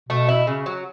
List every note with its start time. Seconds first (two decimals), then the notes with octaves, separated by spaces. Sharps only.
0.09 B2 A3
0.29 E4
0.47 C#3
0.66 F#3